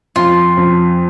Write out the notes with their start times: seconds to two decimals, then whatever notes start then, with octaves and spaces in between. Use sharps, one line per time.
0.16 F2 F4
0.57 F2